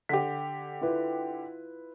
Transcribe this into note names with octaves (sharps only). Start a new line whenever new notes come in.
D3 G4 B6
E4 F4 B4